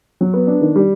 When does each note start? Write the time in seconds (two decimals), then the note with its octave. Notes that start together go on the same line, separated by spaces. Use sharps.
0.21 F#3
0.34 B3
0.47 D4
0.61 D#3
0.76 G3